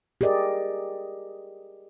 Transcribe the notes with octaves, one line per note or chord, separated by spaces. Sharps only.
G4 G#4 A#4 D5 D#5